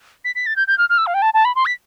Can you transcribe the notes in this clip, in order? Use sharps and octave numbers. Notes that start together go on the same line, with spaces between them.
B6
B6
A6
G6
G6
F6
F6
E6
F5
G5
A5
A5
B5
C6
B6